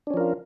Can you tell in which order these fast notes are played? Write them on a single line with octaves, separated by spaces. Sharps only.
D4 C#4 F3 A#4 F4